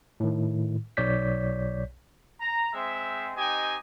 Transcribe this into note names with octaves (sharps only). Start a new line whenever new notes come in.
A2 D#3
B1 C#5 D5 G6 B6
A#5
G#3 C4 E5
C4 D#4 G4 D#5 G5 G#5